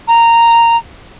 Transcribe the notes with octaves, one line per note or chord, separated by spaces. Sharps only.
A#5